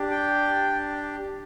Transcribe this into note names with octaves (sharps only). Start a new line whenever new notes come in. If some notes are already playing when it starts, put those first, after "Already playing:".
Already playing: D4 G4
G5